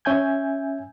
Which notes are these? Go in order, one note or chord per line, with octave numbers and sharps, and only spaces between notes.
C#4 E5 G#5 G6 G#6